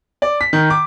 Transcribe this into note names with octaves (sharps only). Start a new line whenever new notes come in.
D5
B6
D#3
D6